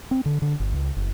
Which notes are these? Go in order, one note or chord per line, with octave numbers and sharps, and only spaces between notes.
C4
D3
D3
G1
C#2
F#1